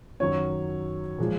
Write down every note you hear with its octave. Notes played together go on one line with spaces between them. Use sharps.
F#2 D#3 F#3 C#5
A#2 F3 G#3